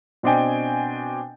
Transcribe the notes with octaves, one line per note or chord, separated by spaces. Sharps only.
B2 C4 D4 D#5 G5 G#5